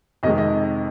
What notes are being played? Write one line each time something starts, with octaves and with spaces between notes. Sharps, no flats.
F2 C3 D#3 G#3 D#5
D#5